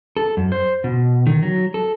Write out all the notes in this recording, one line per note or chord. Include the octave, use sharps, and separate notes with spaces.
A4
F#2
C5
B2
D#3
F#3
A4